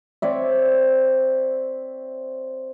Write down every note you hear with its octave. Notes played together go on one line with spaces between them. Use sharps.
C4 C#5 D5 E5